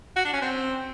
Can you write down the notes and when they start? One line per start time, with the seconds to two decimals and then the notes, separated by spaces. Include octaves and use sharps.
0.16 F#4
0.25 D4
0.33 C#4
0.42 C4